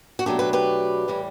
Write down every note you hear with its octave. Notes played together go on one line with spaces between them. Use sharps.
F#4
B2 F#3 A3 D4 G4
G4 B4
G4 B4
A2 E3 G3